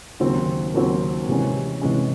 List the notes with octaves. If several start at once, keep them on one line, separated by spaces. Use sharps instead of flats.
D#2 C#3 F#3 C4
D#2 C#3 F#3 C4
C3 E3 G#3 C#4
C3 E3 G#3 C#4